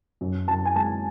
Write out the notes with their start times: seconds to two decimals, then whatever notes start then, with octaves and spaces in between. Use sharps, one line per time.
0.21 F#2
0.48 F#2 A5
0.65 G#5
0.76 G#3 A5